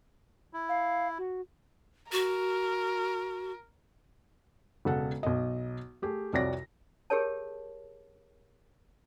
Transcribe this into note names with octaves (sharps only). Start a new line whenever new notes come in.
E4
F5
F#4
F#4 A#4
E1 C#3 A4 F#5
B1 D#5
A3 G4 G#4
C2 F2 F#4 C#5 D5 A#6
G4 G#4 A#4 C#5 A5